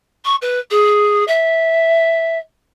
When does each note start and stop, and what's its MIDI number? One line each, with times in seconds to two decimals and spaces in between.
0.25 0.36 85
0.42 0.60 71
0.71 1.24 68
1.28 2.38 76